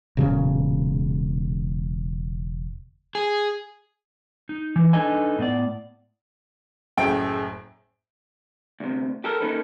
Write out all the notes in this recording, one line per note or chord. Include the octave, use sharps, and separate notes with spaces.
E1 A#2 C#3 F#3
G#4
D#4
E3
D4 D#4 A4 B4 D#5 G#5
A2 B3 D5
F#1 F#2 A2 G#4 G5 D7
D2 C3
G4 A4 A#4
D#3 A#3 C#4 D#4 A4 B4